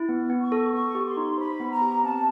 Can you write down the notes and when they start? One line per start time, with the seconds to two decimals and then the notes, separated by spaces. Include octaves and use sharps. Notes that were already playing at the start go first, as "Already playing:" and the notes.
Already playing: E4
0.09 B3
0.30 B3
0.41 C#6
0.52 A4
0.73 B3 C#6
0.95 G4
1.05 C6
1.17 D#4
1.38 C5 B5
1.60 B3
1.71 A#5
1.81 G4
2.03 C4 A5